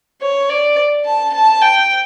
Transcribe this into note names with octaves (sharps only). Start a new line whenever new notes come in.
C#5
D5
A5
A5
G5